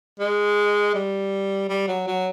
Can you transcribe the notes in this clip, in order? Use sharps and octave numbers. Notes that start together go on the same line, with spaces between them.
G#3
G3
G3
F#3
F#3